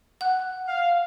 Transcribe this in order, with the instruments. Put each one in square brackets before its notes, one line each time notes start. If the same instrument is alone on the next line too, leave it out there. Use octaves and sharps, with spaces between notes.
[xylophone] F#5 F#6
[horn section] F5